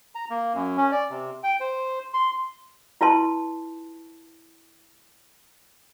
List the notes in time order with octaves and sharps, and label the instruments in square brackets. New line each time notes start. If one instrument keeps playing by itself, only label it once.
[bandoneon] A#5
A#3
F#2
C#4
D5
C3
G5
C5
C6
[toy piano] E4 F4 B4 A5 C6